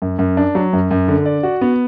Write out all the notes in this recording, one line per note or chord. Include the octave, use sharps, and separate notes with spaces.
F#2
F#2
D4
F#3
F#2
F#2
D3
D5
F#4
B3